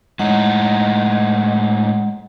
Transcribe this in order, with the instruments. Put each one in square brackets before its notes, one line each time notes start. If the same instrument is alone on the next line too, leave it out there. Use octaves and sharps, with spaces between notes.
[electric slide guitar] A2 D#4 [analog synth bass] G#3 [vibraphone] F#5